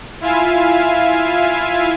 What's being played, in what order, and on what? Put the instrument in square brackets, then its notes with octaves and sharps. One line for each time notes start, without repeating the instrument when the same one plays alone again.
[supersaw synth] E4 F4 E5 F5 G#5